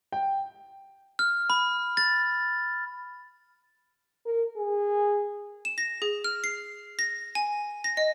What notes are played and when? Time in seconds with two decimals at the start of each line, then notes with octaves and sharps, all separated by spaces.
0.12 G5
1.19 F6
1.50 B5
1.97 A6
4.26 A#4
4.57 G#4
5.65 E7
5.78 A#6
6.02 G#4
6.24 F6
6.44 C7
6.99 A#6
7.35 G#5
7.84 A#6
7.97 D#5